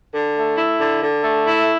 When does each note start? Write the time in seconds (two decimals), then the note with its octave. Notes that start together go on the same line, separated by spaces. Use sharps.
0.14 D3
0.36 A3
0.57 E4
0.79 D3
1.01 D3
1.23 A3
1.45 E4